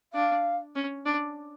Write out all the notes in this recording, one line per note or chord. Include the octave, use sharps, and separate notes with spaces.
D4 F5
C#4
D4